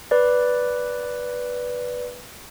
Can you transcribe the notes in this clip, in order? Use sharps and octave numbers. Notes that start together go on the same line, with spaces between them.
B4 D5